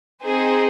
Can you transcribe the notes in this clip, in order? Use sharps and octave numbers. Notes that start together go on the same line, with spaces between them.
C4 D#4 G#4 C5